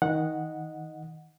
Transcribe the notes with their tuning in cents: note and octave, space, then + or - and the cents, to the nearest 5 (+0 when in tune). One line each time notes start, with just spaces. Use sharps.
D#3 +20 D#5 -5 F#5 -10